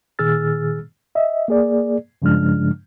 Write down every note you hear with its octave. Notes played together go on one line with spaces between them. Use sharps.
A#2 D#3 G#4 E6 F6 A6
D#5 E5
A#3 G#4 D5
G2 C#3 F3 G#3 D4 F6